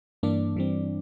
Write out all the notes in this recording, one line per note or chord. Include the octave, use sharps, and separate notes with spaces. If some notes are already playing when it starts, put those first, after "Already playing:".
G2 E3 A#3 D4 D5
G2 E3 G3 C4